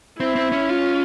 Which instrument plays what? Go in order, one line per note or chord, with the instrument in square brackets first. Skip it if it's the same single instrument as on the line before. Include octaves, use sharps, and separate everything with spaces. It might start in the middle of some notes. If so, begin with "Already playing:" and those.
[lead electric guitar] C4 [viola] E4
[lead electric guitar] C4
C#4
[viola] F4